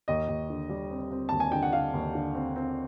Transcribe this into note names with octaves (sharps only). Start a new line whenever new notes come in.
D#2 D#5
D#2
D3
G3
C4
C4
D#2 A5
G#5
D3 G5
F#5
D3 F5
D#2
D3
C4
C4